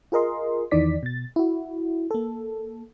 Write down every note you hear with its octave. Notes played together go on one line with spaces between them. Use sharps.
F4 G#4 A#4 D#5 C6
E2 D#3 E3 D#4 D5 B6
B2 A6
E4 F#4
A#3 A4